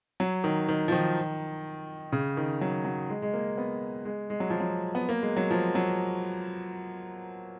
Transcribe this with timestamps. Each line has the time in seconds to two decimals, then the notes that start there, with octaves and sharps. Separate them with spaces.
0.20 F#3
0.44 D#3
0.69 D#3
0.88 F3
0.92 D#3
2.12 C#3
2.37 D#3
2.61 F#3
2.85 F#3
3.09 G#3
3.22 G#3
3.34 A#3
3.58 B3
4.05 G#3
4.30 G#3
4.40 F#3
4.50 F3
4.60 F#3
4.95 B3
5.09 A#3
5.22 G#3
5.37 F#3
5.51 F3
5.75 F#3